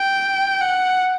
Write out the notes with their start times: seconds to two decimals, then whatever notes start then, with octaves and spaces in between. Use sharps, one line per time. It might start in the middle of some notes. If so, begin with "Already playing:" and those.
Already playing: G5
0.61 F#5